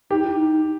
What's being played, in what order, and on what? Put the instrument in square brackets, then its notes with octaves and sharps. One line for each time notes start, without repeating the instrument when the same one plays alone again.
[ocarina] D#4 [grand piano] G4
[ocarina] E4
D#4